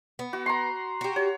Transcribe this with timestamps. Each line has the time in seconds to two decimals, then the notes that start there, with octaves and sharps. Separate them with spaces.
0.19 B3
0.33 F#4
0.46 A#5 C6
1.01 F#4 G4
1.16 C#5